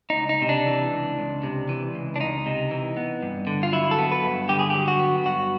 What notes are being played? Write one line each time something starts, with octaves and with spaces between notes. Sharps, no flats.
D#4
C#2
D#4
C3
D4
E3
C#2
C#2
C3
E3
C#2
D4
C#2 D#4
C3
E3
B3
G2
D3
F4
F#3 E4
A4
B3
B4
G2
D3 G4
G#4
F#3 G4
F#4
B3
G2 F#4